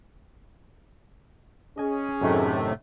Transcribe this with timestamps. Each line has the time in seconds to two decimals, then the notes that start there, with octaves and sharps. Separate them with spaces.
1.78 C#4 G#4 D#5 G#5
2.21 F#2 A2 C3 D#3 F#3 A3